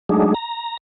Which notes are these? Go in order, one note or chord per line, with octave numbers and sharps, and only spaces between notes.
F#3 G#3 A3 D4 D#4 G#4
A#5